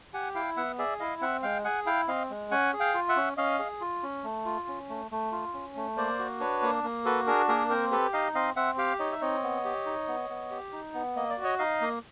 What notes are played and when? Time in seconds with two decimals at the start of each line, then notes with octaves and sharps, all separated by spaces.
0.14 G4 F#5 G#5
0.35 E4 F5 G5
0.57 B3 E5 F#5
0.78 G#4 D5 E5
1.00 E4 D#5 F5
1.21 C4 E5 F#5
1.43 G#3 F5 G5
1.65 G#4 F#5 G#5
1.86 E4 F5 G5
2.08 C4 D#5 F5
2.30 G#3
2.51 C#4 F#5 G#5
2.73 G#4
2.80 F5 G5
2.94 F4
3.09 E5 F#5
3.16 C#4
3.37 C#4 D#5 F5
3.59 G#4
3.81 F4
4.03 C#4
4.24 A3
4.45 F4
4.68 C#4
4.89 A3
5.11 A3
5.32 F4
5.53 C#4
5.76 A3
5.97 A#3 C5 D5
6.19 F#4
6.40 D4 B4 C#5
6.62 A#3
6.84 A#3
7.05 F#4 A4 B4
7.27 D4 G#4 A#4
7.48 A#3 G#4 A#4
7.70 C4 A#4 C5
7.91 G4 A4 B4
8.13 D#4 D#5 F5
8.35 C4 D#5 F5
8.56 C4 E5 F#5
8.78 G4 F5 G5
8.99 D#4 C#5 D#5
9.12 E5
9.22 C4 C#5 D#5
9.43 B3
9.65 G4
9.86 D#4
10.08 B3
10.30 B3
10.51 G4
10.73 D#4
10.94 B3
11.16 A#3 D#5
11.30 D5
11.38 F#4
11.44 C#5 D#5
11.59 D#4 D#5 F5
11.81 A#3